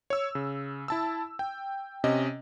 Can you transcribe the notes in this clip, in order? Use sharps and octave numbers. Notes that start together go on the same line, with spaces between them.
C#5 E6
C#3
E4 A5 E6
G5
C3 C#4 D#5